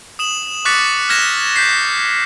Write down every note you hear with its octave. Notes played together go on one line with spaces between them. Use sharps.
D#6 E7 F#7
C#6 D6 F#6 A6 B6 C#7
F6 G#6 A#6 E7
G6 B6 C7